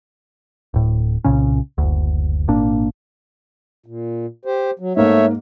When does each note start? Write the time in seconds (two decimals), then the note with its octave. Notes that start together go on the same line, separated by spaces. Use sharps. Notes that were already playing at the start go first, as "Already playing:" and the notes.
0.74 D1 A2
1.24 C2 A#2 C#3 C#4
1.78 F#1 D2
2.48 G#1 A#2 A#3 D4
3.86 A#2
4.45 G4 C5
4.79 F#3
4.97 G#2 A3 A#3 C#5 E5